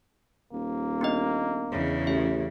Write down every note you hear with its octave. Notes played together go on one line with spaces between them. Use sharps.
D#1 A#3
B3 D4 D#5
E2 C#3
A1 E5